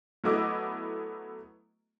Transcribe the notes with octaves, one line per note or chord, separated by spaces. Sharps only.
F#3 A3 B3 E4 D#5 D6